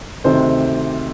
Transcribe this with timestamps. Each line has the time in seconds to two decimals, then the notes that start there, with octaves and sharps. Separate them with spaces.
0.24 D2 C3 D#3 C5